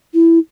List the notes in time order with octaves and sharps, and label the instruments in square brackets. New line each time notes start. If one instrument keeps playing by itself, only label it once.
[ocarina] E4